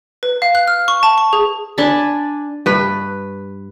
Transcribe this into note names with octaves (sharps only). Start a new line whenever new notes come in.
B4
F5
F#6
F6
C#6
A5
C#6
G#4
D4 G#5 A5 B5
G2 B4